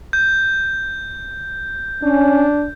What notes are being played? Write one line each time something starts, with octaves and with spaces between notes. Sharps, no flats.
G6
C#4 D4